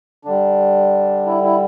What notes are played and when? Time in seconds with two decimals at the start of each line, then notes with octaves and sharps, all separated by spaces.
0.25 D3 G3 D4
1.26 E4
1.43 E4